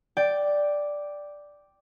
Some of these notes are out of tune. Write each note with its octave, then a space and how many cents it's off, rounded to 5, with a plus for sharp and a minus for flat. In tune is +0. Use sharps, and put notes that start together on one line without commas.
D5 +0 G5 +0